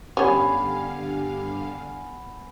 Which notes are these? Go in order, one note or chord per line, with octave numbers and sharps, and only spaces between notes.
G2 D3 G3 B3 C#4 G4 F5 G#5